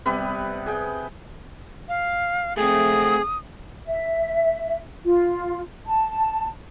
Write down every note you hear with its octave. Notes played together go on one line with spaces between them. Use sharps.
C3 G3 B3 B4
G#4 G5
F5
A3 C4 G#4 D#6
E5
F4
A5